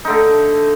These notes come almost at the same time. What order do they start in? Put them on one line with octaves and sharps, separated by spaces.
D#4 D3 A3